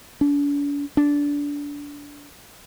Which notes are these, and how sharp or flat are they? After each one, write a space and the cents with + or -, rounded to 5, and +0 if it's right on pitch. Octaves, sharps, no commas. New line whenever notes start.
D4 -45
D4 -20